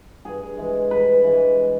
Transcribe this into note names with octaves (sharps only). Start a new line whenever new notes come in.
G2 G#4
E3 G#3
G2 B4
E3 G#3